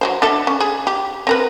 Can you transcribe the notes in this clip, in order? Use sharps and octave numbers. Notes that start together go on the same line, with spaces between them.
F#3 G#3 C5
D4 A4 E5
C#4
G#4
G4
C4 A#4 B4